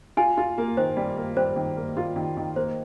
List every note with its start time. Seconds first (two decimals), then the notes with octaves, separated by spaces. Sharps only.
0.17 F4 G#5
0.38 F4
0.58 A#3
0.77 D#3 C5
0.97 G3
1.17 A#3
1.37 G3 C5
1.56 D#3
1.77 A#3
1.97 F4
2.16 D#3
2.37 D#3
2.56 A#3 C5